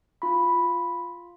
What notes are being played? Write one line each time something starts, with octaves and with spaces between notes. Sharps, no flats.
F4 B5